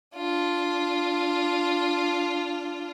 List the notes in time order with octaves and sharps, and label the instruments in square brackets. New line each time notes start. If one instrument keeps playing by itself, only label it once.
[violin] D4 F4